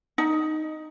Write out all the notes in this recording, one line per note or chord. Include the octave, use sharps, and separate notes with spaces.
D#4